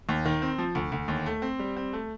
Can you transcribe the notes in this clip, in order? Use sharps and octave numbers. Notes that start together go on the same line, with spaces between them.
D#2
D#3
C4
F3
D2
D2
D#2
A3
C4
G3
C4
A3